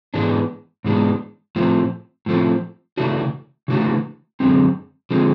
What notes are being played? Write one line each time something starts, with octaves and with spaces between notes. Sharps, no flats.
G#2 E3 G#3 B3 D4
G#2 E3 G#3 B3 D4
A2 F3 A3 C4
A2 F3 A3 C4
C#3 E3 A3 D4 F#4
C#3 E3 A3 D4 F#4
F#2 D3 F3 G#3 C4
D3 F3 G#3 C4